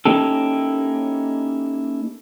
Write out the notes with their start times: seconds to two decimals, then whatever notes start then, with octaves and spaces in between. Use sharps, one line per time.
0.05 A#3 C#4 D#4 E4 G4 A4